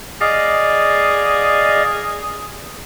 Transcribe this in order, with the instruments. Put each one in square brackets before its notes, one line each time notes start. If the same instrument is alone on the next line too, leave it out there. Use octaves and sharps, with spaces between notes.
[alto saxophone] G#4 [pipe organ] D5 D#5 F5